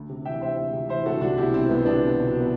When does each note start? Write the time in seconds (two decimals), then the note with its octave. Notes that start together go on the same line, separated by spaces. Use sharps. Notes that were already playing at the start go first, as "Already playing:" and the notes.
Already playing: D2
0.09 C3
0.25 E3 E5 G5
0.42 D2 C5 E5
0.58 D2
0.73 C3
0.89 E3 C5 E5
1.06 D2 F#4 A4
1.21 C2 D4 F#4
1.38 B2 E4 G4
1.53 F#3 C4
1.69 C2 B3
1.85 C2 B3 D4
2.02 B2
2.18 F#3
2.41 B3